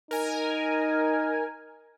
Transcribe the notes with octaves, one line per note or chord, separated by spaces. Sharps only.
D#4 A#4 G#5